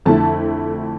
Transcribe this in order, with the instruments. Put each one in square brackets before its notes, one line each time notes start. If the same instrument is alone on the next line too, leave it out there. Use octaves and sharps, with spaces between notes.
[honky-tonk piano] F2 D3 A3 E4 A5